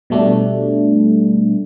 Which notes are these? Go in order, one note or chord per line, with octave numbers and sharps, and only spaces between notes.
B2 G3 A3 D4